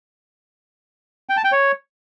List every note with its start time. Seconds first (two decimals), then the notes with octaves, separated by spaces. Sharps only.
1.29 G5
1.37 A5
1.44 G5
1.52 C#5